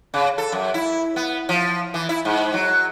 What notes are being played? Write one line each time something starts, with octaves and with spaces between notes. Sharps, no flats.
C#3
A4
F#2
E4
B3
F3
E3
E4
G#2
F#3